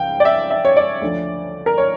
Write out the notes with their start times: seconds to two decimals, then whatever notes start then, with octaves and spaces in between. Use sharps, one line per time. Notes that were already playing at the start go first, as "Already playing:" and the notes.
Already playing: C#2 C#3 F3 F5 G5
0.20 D5
0.25 E5
0.50 E5
0.65 C#5
0.77 D5
1.02 D2 D3 F3
1.66 A#4
1.78 C#5